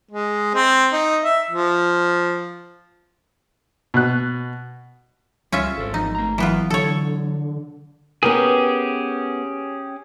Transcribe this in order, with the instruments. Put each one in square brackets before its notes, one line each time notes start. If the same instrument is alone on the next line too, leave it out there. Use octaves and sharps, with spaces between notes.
[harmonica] G#3
C4
D#4
E5
F3
[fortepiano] B2 F#6
[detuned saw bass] C#2 [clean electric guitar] G3 [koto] C#4 F4 E5
[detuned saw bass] G#1 [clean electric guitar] A4 C5
[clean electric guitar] E2 F3 A#4 [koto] D#4
[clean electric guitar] A3 A#5
[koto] E3 B3 F4 [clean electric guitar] F#3
[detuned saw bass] D3 [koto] A4 C#5
[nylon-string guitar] B3 A#4 B4 [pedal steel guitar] C#4 G4 G#4